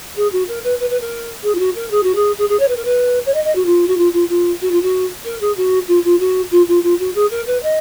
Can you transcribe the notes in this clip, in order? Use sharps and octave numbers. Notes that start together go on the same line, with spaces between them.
G#4
F#4
A#4
B4
B4
B4
A#4
G#4
F4
F#4
A#4
G#4
F#4
G#4
G#4
G#4
C#5
B4
A#4
B4
C#5
D#5
D#5
F#4
F4
F#4
F4
F4
F4
F#4
F4
F#4
A#4
G#4
F#4
F4
F4
F#4
F4
F4
F4
F#4
G#4
A#4
B4
D#5